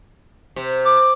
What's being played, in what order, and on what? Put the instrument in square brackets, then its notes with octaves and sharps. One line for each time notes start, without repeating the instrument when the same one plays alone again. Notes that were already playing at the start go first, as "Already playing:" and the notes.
[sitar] C3
[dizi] D6